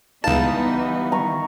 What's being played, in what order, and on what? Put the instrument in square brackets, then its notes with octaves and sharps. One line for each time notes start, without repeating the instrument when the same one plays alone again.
[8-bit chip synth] C#2 A5 [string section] E3 G3 D#4 [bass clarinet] B3 [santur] F5
[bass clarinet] B3
[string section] D#3 E3 [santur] A#5 C#6